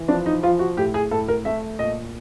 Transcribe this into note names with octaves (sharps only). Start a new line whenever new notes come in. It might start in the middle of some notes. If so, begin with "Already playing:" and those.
Already playing: E3
F3 D4
D#4
F3 F4
F#4
A2 G4
G#4
A2 A4
A#4
A3 E5
A#2 D#5